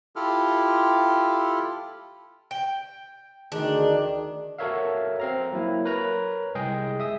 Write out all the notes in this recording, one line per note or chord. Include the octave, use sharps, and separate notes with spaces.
E4 F4 G4 A4 F6
G5
D2 D#3 D4 G#4
F#4 A4 A#4 C#5 E5 F5
C4 F5 A#5
F#3 A#3 E4
A#4 B4 C#5 A#5
C2 G#3 G#4 D#5 G5
E5 D#6